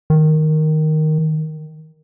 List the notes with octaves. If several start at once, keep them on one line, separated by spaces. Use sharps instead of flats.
D#3